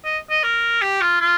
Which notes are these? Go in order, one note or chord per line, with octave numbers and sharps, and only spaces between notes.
D#5
D#5
A#4
G4
F4
F4